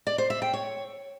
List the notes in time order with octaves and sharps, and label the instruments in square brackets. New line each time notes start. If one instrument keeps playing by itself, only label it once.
[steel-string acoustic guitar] D5
C5
E5
G5
C#5